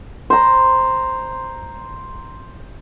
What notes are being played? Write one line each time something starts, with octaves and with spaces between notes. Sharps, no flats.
C5 A#5